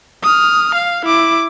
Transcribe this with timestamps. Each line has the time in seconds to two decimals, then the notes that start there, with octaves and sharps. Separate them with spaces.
0.23 D#6 F6
0.75 F5
1.06 E4 D6